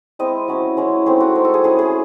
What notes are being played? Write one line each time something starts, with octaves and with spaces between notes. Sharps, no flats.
G#3 C4 E4 D#5
F#3 C#4 E4
G#3 C#4 E4
A3 C4 D#4 G#4
F#4
G#3 C4 D#4
A4
G#4
A3 C#4 E4 G#4
G#4